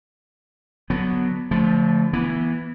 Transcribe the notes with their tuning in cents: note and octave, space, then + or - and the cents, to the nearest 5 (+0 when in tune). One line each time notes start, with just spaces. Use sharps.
D3 +0 F#3 +0 B3 +0
D3 -40 F3 +0 A3 +0
E3 +0 B3 -25